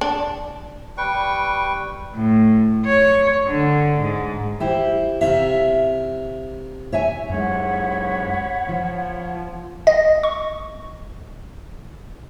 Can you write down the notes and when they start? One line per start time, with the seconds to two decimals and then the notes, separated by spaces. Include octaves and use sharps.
0.01 D4
0.97 G3 B4 G5 C#6
2.15 A2
2.85 C#5
3.47 D3
4.00 G#2
4.60 E4 G4 C5
5.21 C3 E5 F5 A#5
6.92 C#5 E5 G#5
7.29 F#2 G#3 C#5 F#5 B5
8.69 F3
9.87 D#5
10.23 C#6